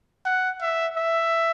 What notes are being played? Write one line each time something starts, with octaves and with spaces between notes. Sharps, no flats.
F#5
E5
E5